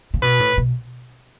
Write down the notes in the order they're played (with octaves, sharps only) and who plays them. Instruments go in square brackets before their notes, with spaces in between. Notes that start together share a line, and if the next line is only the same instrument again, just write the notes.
[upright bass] C#3
[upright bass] B2 [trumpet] B4
[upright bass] A2
B2